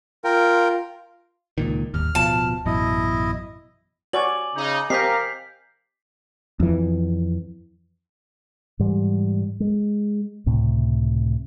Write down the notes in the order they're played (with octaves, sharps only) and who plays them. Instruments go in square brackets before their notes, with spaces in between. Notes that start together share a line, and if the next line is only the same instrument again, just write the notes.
[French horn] F4 [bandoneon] A#4 G5
[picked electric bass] C#2 A#2 D#3
[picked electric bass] D1 G1 D#2 [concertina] F6
[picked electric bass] D1 B2 F3 [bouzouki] A5
[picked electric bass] A1 F#2 B2 [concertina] E4 D#5
[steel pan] F#4 C#5 D5 [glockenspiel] G#5 D6 F#7
[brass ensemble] C#3 D#4
[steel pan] C4 G4 D#5 [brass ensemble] A#4 F5 [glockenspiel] G6 B6 C7
[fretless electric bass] F2 E3
[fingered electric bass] G#2 E3 G3
G#3
C#2 A2 C3